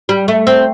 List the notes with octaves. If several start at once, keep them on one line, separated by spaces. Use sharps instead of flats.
G3
A3
C4